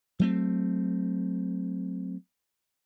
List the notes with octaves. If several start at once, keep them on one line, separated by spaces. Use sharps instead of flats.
F#3 A3 C4